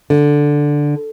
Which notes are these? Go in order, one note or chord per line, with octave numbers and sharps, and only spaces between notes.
D3